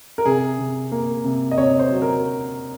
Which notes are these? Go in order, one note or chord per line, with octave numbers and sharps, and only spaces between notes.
A#4
C3 G#4
C3
A#3
C3
D#5
C3 C#5
C5
F#3
A#4